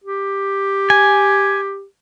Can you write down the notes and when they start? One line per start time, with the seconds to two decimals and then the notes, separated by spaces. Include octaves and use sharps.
0.04 G4
0.90 G#5